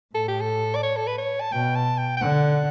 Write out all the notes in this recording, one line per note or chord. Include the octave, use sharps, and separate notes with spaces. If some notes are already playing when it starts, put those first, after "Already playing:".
A2 A4
G4
A4
D5
C#5
A4
B4
C#5
A5
B2 G5
A5
G5
G5
D3 F#5